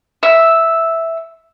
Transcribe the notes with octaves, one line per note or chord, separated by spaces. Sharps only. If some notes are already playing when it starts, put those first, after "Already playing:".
E5 E6